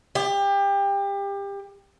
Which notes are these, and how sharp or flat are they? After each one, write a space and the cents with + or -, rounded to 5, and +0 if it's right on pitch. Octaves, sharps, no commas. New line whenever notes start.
G4 +25